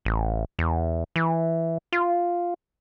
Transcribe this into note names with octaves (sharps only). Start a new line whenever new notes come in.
A1
E2
E3
F4